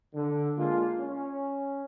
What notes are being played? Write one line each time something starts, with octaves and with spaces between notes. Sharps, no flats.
D3
G#3 A#3 D4 F4
C#4